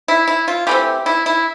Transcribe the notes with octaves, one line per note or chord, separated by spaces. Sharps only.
E4
E4
F4
E3 A3 C4 G4
E4
E4